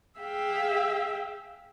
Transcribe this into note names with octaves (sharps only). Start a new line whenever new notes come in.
G#4 E5 F5 G5